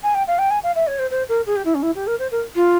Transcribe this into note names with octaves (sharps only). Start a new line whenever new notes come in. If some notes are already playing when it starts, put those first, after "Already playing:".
G#5
G5
F5
G5
G#5
F5
E5
C#5
C5
C5
A#4
G#4
G4
E4
C#4
E4
G4
A#4
C5
A#4
F4